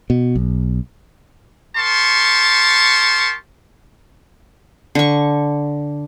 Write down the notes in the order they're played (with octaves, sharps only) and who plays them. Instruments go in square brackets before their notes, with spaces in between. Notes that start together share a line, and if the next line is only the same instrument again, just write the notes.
[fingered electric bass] B2
B1
[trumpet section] G4 A#4 A5 C6 C#6
[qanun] D3 C#6